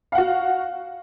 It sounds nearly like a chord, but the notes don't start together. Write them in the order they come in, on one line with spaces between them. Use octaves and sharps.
F5 F#5 F#4